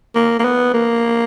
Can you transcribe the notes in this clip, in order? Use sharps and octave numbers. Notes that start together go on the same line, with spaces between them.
A#3
A#3
B3
A#3